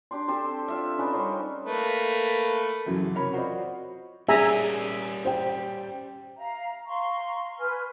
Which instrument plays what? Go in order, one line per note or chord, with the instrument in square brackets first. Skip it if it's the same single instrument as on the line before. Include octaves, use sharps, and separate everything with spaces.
[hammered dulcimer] D4 G4 C6
C4 G4 A4 C5
F4 E5
C#4 D#4 B4 D5
G3 A#4 C5 C#5
[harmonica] A3 A#3 B4
[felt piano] F#2 C#3 E3 F#3
C3 A#4 C#5 B5
F4 F#4 C5 D5 D#5
[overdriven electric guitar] G3 C#4 [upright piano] G#4 D5 [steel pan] E5 G#5 A#5
[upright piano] C5 G5
[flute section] E5 F5 A#5
F5 A#5 C6 C#6
B4 G#5 F6